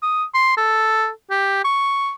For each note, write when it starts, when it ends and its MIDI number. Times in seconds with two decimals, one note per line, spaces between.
0.03 0.24 87
0.35 0.54 84
0.57 1.09 69
1.30 1.60 67
1.64 2.13 85